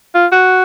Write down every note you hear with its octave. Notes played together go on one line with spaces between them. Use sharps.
F4
F#4